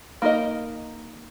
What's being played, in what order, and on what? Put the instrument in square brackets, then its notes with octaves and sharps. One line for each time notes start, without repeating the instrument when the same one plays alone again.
[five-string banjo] A#3 D#4 A#4 D#5